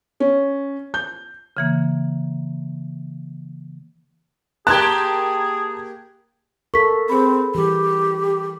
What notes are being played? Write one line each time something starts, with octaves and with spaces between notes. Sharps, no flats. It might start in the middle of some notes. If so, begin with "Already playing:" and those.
C#4
G6
C#3 E3 A#3
A#3 G4 G#4 A5 A#5 C6 F#6 G#6
A4 A#4 C#6 B6
C4 G#4 B5
E3 G3 G4